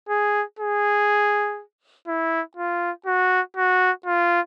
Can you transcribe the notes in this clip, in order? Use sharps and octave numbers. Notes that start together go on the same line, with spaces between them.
G#4
G#4
E4
F4
F#4
F#4
F4